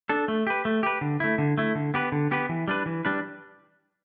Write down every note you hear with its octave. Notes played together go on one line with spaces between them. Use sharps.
D4 A4
A3
G4 B4
A3
G4 B4
D3
A3 E4
D3
A3 E4
D3
B3 G4 B4
D3
B3 G4 B4
E3
G3 D4 B4
E3
G3 D4 B4